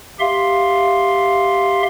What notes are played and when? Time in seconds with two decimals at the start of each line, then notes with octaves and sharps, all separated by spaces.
0.20 G4 E5 F5 C6